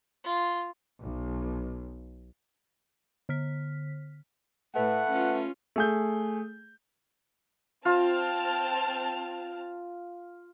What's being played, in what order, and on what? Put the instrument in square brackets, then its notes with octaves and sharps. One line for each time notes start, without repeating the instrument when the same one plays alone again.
[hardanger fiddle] F4
[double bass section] B1
[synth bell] D3 F6 B6
[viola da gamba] A2 [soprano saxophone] A3 [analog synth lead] B4 [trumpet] F#5
[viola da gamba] C#4 F4
[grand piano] A3 G#4 G6
[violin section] C4 A5 F6 [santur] F4